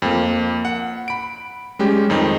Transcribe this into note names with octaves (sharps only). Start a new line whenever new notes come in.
F2 A#3
F#5
B5 D7
G3 G#3 C#4 G4
F2 D#3 D#4